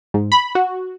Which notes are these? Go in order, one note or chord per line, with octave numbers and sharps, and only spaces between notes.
G#2
B5
F#4